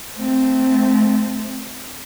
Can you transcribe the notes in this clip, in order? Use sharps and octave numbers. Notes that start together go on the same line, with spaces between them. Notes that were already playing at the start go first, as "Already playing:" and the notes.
A3 C4